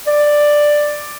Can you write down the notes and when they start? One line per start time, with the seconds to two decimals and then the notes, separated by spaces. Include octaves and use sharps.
0.07 D5